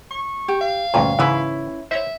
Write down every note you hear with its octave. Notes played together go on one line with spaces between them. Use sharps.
C#6
G4
F5
D2 G2 A#2 C#4
G#2 C#3 E3 C#4 E4 B4
C5 C#5 E5